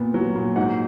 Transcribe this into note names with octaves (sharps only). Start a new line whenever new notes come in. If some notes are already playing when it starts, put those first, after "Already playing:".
Already playing: A#2 B3
F#3
A#2
G#2 F#5